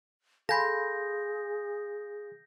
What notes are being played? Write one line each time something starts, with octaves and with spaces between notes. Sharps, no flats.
G#4 A4 F5 G#5 B5 C6 G6 A#6